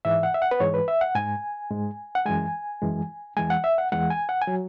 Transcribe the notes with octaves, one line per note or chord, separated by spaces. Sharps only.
G#2 E3 G#3 E5
F#5
E5
F#5
B4
G#2 E3 G#3 C#5
B4
E5
F#5
G#2 G#3 G#5
G#2 G#3
F#5
F#2 E3 G#3 G#5
F#2 E3 G#3
E2 E3 G#3 G#5
F#5
E5
F#5
E2 E3 G#3 F#5
G#5
F#5
G#5
F#3